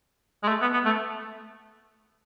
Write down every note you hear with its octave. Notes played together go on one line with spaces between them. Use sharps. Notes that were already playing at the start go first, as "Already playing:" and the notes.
G#3
A3
B3
B3
A3